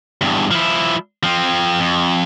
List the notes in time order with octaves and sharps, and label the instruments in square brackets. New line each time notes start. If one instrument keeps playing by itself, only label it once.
[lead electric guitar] E2 G2
F3 E4
F3 C4
F2